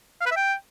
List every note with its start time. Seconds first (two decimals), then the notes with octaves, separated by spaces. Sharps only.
0.21 F5
0.26 B4
0.31 E5
0.37 G5